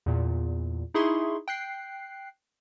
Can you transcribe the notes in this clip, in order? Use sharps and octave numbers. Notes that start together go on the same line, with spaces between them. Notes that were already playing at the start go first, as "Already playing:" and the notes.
E2 A#2
D#4 E4 G#4 E5 C6 C#6
G5 F#6 C7